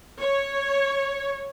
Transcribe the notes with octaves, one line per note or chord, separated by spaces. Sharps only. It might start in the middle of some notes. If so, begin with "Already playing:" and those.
C#5